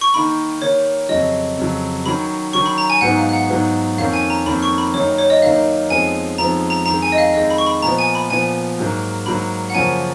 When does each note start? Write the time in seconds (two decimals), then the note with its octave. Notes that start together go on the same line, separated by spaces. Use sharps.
0.01 C#6
0.14 D#3 A#3 D#4 B5
0.61 D#3 A#3 D#4 C#5
1.09 F2 C#3 F#3 D#5
1.58 F2 C#3 F#3
2.06 D#3 F#3 C#4 B5
2.53 D#3 F#3 C#4 C#6
2.66 B5
2.78 A#5
2.90 G#5
3.01 G#2 F#3 B3 D#4 F#5
3.18 F5
3.29 F5
3.33 F#5
3.50 G#2 F#3 B3 D#4
3.97 F2 D#3 A#3 C#4 F5
4.14 G#5
4.30 A#5
4.46 F2 D#3 A#3 C#4 B5
4.63 C#6
4.78 B5
4.94 F#2 D#3 A#3 D#4 C#5
5.18 C#5
5.30 D#5
5.42 F#2 D#3 A#3 D#4 F5
5.89 F2 F3 G#3 B3 D#4 G#5
6.38 F2 F3 G#3 B3 D#4 A#5
6.70 A#5
6.86 F2 D#3 G#3 A#5
7.02 G#5
7.12 D#5
7.18 F5
7.34 F2 D#3 G#3 D#5
7.50 B5
7.58 C#6
7.66 B5
7.82 A#2 F3 B3 A#5
7.99 G#5
8.15 B5
8.30 A#2 F3 B3 G#5
8.79 G#2 F#3 A#3
9.26 G#2 F#3 A#3 B5
9.70 F#5
9.74 F#2 C#3 F3 A#3 C#4 G#5